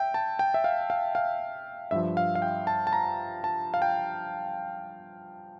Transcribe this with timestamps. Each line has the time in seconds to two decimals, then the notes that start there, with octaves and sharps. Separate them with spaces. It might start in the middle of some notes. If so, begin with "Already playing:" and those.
Already playing: E5 G5
0.14 A5
0.39 G5
0.54 E5
0.64 F5
0.90 F5
1.15 F5
1.91 G2 F3 E5
2.17 F5
2.35 F5
2.42 G5
2.67 A5
2.87 A5
2.93 A#5
3.44 A5
3.74 F5
3.82 G5